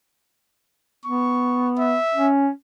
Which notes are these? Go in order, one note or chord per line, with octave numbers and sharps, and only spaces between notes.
B3 C#6
E5
C#4